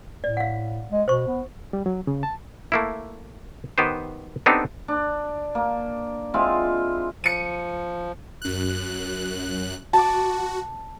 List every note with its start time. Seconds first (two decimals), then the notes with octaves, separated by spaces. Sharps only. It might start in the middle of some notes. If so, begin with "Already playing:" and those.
0.24 A2 D5
0.37 F5 F#5
0.92 G#3
1.08 B2 C5 C#6
1.27 B3
1.73 G3
1.86 F#3
2.07 C#3
2.23 A5
2.72 A3 A#3 E4
3.78 D#3 B3 G4 B4 C5
4.46 B3 C4 D4 D#4 G4 A4
4.88 D4
5.55 A#3
6.34 G#3 C4 E4 F4
7.24 F3 C#7 D#7
8.42 F#2 F#6
9.93 F#4 A5 D6